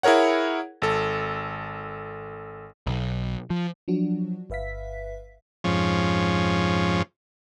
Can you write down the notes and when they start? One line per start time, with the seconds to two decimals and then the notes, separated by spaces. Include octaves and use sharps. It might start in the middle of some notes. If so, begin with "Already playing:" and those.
0.03 E4 G#4 A#4 C#5 F#5
0.82 G#1 A4
2.87 B1
3.50 F3
3.88 F3 F#3 D4 F#4
4.50 G1 B4 E5 F5 B6
5.64 F2 G#2 F3 C#4